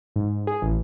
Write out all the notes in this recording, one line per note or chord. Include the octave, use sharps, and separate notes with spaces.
G#2
G#4
A1